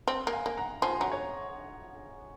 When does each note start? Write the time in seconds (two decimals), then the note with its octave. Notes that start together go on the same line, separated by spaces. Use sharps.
0.08 C4
0.27 A#3
0.33 F5 G#5
0.46 A#3
0.57 F#5 A#5
0.82 F3 G#5 C6
1.00 F#3 F#5 A#5
1.12 C#5